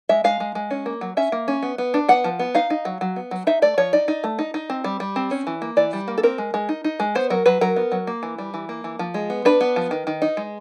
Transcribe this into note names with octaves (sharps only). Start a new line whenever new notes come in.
G#3 E5
G#3 F5
G#3
G#3
C#4
A#3
F#3
C#4 E5
A#3
C#4
B3
B3
D4
B3 F#5
F3
B3
D#4 F5
D#4
F#3
F#3
B3
F#3
D#4 E5
A3 D5
F3 C#5
D#4 D5
D#4
A3
D#4
D#4
C4
G3
G3
C4
C#4
E3
A#3
E3 D5
G3
A#3
A4
C4 A#4
G#3
G#3
D#4
D#4
G#3
B3 C5
F#3 A#4
F#3 B4
F#3 A#4
B3
F#3
A#3
E3
G3
E3
A#3
E3
F3
G#3
B3
D4 B4
B3
F3
D#3
D#3
D#4
G#3